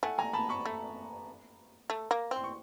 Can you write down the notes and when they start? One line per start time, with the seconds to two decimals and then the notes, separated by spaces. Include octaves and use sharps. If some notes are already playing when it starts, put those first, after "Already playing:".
0.03 A3 F#5 G#5
0.18 G#5 A#5
0.33 A5 B5
0.49 B5 C#6
0.66 A3
1.90 A3
2.11 A#3
2.31 C4 C6
2.44 C#6